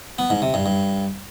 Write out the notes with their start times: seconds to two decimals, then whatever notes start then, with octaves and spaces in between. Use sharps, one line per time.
0.19 B3
0.30 G#2
0.42 C3
0.54 G2
0.66 G2